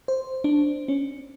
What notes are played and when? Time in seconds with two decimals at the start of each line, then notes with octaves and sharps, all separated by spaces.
0.08 C5
0.44 D4
0.88 C#4